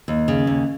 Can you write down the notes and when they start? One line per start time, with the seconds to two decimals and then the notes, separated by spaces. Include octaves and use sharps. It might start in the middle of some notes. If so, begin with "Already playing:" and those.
0.08 D#2
0.28 C#3
0.47 D#2